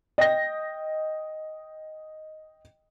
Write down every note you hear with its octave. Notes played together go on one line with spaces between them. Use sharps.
D#5 G5 A#6